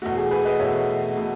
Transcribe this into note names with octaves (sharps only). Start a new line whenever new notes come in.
E2 B2 A3 F#4
G#4
G#4 B4
B4 D#5
E2 B2 A3 C#5 E5
B2 A3